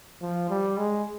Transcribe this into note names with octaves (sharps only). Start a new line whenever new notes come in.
F3
G3
G#3